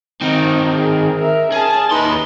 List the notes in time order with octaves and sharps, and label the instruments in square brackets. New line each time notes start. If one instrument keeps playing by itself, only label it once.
[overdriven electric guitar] D#3 C4 [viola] D#4
[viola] G#4 A#4
A#4 E5
[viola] C#4 A5 [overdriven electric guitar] G#4
[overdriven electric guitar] D#2 C6 [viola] D#4 B4